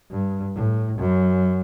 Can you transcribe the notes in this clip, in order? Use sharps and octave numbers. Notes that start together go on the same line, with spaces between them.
G2
A2
F#2